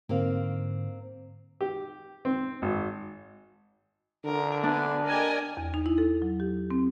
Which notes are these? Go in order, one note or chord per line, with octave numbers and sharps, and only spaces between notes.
G#2 D3 A#3 C4 F5
G4
C4
G#1
D3 A#4
B3 D4 G#5
G4 A#4 D5 D#5 G#5
E2
D#4
E4
A4
F#3
G4
C4